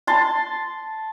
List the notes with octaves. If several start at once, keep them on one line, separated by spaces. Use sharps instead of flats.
A5 C6